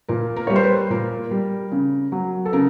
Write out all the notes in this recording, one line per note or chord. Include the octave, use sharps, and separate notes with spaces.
A#2 A#4
A#4
G3 C#5
C5
B4
A#2 A#4
G3
C#3
F#3
A4
C#3 A#4